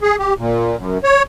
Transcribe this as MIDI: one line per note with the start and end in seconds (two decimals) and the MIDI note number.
0.02 0.16 68
0.18 0.34 67
0.38 0.76 46
0.77 0.98 42
1.04 1.23 73